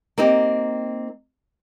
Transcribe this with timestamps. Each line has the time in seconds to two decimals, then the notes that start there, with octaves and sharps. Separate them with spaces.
0.18 A#3 C4 D#4 G4